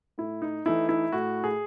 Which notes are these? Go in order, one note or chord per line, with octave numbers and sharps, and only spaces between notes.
A2 E4
D#4
E3 A3 D#4 E4
E4
A2 F#4
G#4